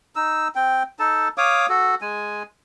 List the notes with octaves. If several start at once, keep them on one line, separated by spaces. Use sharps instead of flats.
D#4 E6
C4 G5
D#4 A4 A5
C#5 F5 D6 D#6
F#4 A4
G#3 G#5